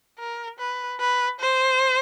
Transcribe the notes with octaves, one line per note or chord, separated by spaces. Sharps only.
A#4
B4
B4
C5